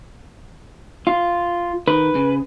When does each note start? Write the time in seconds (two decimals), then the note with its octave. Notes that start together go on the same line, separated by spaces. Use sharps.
1.07 F4
1.88 D#3 B4
2.15 C#3